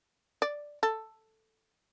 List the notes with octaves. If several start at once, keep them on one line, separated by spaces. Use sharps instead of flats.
D5
A4